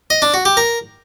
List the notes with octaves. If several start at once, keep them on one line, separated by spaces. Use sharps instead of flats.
D#5
D4
F#4
G4
A#4